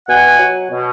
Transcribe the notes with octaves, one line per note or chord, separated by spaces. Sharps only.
B2 F#5 G#5
F#3
B2